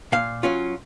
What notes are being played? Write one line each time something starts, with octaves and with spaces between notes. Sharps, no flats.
A#2 F5
F#3 C#4 F4